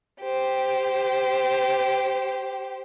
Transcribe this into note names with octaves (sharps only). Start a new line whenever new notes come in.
G4 C5